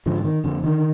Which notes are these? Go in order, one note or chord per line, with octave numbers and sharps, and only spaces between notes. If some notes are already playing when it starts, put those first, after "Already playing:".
G#2 D3 F3
D#3
F2 D3
D3 D#3